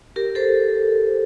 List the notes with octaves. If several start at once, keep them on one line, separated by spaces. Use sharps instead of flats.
G4 A#4
A4 C5